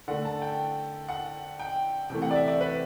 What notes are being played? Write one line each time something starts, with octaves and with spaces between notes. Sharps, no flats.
D3 A3 F#5
A5
G5
F#5
G5
C3 E3 A3 G5
F#5
D5
E5
D5
B4